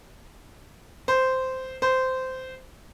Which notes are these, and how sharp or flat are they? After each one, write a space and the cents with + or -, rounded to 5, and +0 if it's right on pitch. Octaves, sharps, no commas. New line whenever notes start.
C5 -10
C5 -15